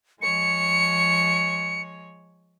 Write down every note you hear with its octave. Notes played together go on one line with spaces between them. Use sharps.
F3 G#3 C#5 C#7